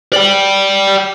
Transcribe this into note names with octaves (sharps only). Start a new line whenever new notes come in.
D5 G5